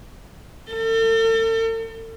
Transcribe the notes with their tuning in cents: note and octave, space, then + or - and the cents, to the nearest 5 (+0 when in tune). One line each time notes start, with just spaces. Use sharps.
A4 +40